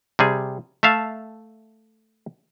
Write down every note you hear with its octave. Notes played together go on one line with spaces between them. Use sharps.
C3 G3 G#4
A3 E5 F5 A5